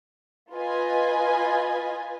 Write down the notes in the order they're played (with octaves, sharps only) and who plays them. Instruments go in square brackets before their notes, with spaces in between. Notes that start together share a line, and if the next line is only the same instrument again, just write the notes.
[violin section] F4 B4 D#5 G#5